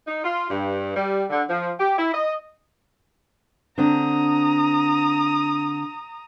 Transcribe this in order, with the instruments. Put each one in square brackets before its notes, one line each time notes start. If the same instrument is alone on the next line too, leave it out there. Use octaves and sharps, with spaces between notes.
[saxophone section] D#4
F4
G2
G3
D3
F3
G4
E4
D#5
[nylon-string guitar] D3 C4 D4 [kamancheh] A#5 D#6